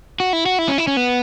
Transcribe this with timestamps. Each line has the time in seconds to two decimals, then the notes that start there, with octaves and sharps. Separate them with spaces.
0.20 F#4
0.33 E4
0.46 F#4
0.59 E4
0.68 C#4
0.78 E4
0.87 C#4
0.97 B3